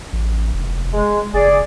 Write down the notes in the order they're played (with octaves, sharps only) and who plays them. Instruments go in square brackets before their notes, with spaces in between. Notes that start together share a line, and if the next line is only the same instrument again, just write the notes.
[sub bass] A1
F1
[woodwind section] G#3
[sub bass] F#1 [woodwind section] G#4 D5